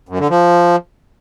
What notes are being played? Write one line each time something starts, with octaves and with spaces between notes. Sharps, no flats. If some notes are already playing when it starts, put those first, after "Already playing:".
F#2
D3
F3